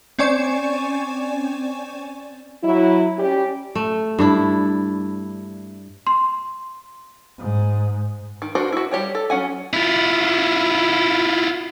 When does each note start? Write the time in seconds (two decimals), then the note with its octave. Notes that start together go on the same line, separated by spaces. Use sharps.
0.19 C4 C#4 D5 G#5 C#6 E7
2.64 F#3 E4
3.18 G3 C#4 G4
3.75 A3
4.19 G2 D4 E4
6.07 C6
7.38 G#2
8.42 D#3
8.55 D4 F#4 A#4 C5
8.72 E4 F#4
8.91 G3 G4 C#5 G5
9.15 A4
9.30 F#3 C#4 F#5 G#5
9.73 E4 F4